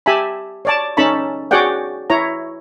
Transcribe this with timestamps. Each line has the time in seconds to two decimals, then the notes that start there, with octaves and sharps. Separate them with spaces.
0.06 G4 E5 G#5 A5 B5
0.65 C#5 D5 A5
0.97 C#4 D#4 A4 A5 B5 C#6
1.51 F#4 G#4 C#5 D5 F#5 G5
2.10 E4 C#5 A#5